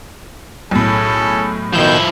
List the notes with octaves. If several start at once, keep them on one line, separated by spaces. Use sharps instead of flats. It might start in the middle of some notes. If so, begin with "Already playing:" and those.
B1 A2 C#4 G#4 A4
B2 D#3 F3 E4 G6